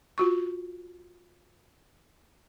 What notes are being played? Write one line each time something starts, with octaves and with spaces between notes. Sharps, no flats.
F4 F#4 C#6